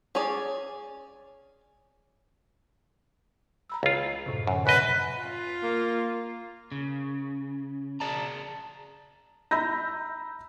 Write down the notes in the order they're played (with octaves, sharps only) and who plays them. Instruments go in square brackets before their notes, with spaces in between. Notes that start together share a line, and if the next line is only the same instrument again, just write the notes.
[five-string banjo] C#4 G#4 C#5 D5
[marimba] A#5 B5 E6
[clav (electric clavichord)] C#2 F4
[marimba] F#2 A2 C3
[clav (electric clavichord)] F#2 [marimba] D3
[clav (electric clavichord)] F#2 D#5 [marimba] B2 B5 A#6 [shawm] B4
[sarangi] F4
[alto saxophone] A#3
[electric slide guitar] C#3
G#4 D5 A5 A#5
[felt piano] A#5 B5 E6 G6 A#6